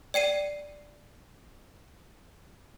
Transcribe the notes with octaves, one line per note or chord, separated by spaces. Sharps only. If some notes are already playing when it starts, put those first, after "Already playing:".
D5 G5 C7 D#7